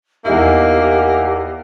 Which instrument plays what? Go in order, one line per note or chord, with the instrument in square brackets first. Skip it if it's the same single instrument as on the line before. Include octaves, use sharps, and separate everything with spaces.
[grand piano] E2 D#4 E4 [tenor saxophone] A#3 [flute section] G4